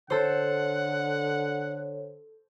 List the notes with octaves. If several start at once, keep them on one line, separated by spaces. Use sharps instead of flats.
D3 A4 C5 C#5 F#5